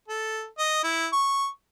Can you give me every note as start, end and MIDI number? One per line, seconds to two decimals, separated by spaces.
0.08 0.46 69
0.58 0.79 75
0.83 1.07 64
1.13 1.47 85